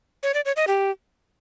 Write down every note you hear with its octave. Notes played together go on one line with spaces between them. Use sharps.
C#5
D5
C#5
D#5
G4